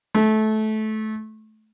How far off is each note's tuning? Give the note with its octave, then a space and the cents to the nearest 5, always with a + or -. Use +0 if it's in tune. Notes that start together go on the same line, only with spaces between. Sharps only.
A3 -20